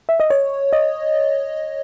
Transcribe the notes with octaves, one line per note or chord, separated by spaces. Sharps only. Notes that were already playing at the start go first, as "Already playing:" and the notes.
E5
D#5
C#5
D#5